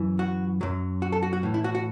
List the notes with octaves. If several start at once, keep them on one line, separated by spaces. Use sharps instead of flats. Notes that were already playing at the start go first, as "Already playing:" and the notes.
Already playing: F#2 E3
F#4
F#2 F#3
F#4
A4
F#4
F#4
A2 E3
E4
F#4
F#4